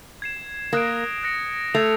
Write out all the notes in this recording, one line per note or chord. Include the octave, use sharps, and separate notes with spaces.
G#6 C7 E7
A#3 D#6 F#6 A#6 D7
F#6 A#6 C#7
A3 G#6 C7 F7